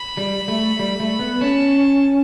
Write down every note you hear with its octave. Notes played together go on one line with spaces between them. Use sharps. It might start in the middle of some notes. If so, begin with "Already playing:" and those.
Already playing: B5
G3
A3
G3
A3
B3
C#4 A5